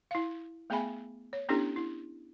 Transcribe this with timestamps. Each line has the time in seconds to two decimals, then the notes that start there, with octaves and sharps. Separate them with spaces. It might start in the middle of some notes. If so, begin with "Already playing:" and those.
0.11 E4 F5
0.70 A3 B3 G#4 E5 G#5 B5
1.33 C#5
1.49 B3 C#4 D4 E4 G4 A4
1.76 E4